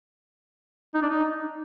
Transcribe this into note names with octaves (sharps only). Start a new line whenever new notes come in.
D#4
D4
D#4